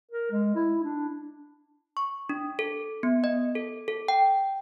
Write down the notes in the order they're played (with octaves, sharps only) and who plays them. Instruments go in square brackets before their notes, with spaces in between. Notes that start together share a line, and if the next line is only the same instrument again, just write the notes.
[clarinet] A#4
G#3
E4
D4
[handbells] C#6
D4
A4
B3
D#5
A4
A4
G5